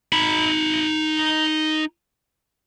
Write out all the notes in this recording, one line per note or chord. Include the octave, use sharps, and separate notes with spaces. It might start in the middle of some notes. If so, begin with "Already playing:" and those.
D#4 B5